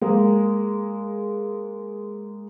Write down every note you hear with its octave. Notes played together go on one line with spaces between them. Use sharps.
G#3 A#3